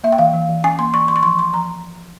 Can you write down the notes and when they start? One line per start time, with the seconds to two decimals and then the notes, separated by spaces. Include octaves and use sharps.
0.04 A#3 E5
0.12 G5
0.18 E3 F5
0.33 E3
0.49 E3
0.64 C#4 G#5
0.79 A#3 C6
0.94 E3 C#6
1.08 E3 C6
1.16 C#6
1.23 F3 C6
1.38 F3 C6
1.53 F3 A#5